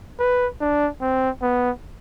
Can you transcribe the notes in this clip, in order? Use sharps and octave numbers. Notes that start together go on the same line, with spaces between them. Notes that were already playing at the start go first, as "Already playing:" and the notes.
B4
D4
C4
B3